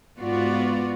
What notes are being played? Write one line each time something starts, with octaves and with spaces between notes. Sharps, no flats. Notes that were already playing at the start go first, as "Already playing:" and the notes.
G#2 B3 F4 F#4 D5